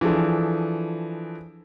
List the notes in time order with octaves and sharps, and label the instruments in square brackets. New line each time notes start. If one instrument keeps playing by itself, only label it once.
[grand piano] E3 F3 D4 G#4 A4